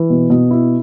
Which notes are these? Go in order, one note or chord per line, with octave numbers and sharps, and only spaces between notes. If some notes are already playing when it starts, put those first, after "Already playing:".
Already playing: E3
B2
B2
E4